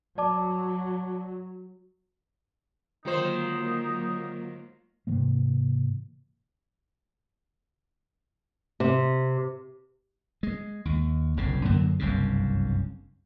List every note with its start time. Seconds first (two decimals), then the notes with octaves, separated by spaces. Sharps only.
0.18 F#3 D5 A5 D6
3.05 D3 D#3 F#3 G#3 A#3 D#4 F4 C5
5.07 G#2 C3 E3 A#3
8.80 C3
10.43 G#3
10.85 D#2
11.37 F#1 C2 C#3
11.65 F#2 D3 F#3 A#3
11.99 F#1 C2 G2 C#3